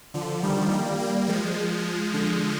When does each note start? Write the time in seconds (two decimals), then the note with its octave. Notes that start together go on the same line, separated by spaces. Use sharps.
0.14 D3 F3
0.43 D#3 G3
0.71 G3 A#3
0.99 G3 A#3
1.28 F3 G#3
2.13 D3 F3